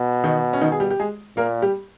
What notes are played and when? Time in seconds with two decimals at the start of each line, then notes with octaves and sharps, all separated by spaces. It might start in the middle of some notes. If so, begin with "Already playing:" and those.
Already playing: B2
0.24 D#3 D#4
0.53 C#4
0.61 D#3 D#4
0.72 G#4
0.80 G3 G4
0.90 G4
1.00 G#3 G#4
1.37 A#2 A#3 A#4
1.62 G3 G4